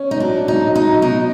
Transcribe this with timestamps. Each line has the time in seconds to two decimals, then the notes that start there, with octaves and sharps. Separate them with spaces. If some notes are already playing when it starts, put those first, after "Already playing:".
Already playing: C#4
0.11 D#4
0.20 F#3 D4
0.48 D#4
0.62 F#3
0.75 D#4
1.02 B2 D#4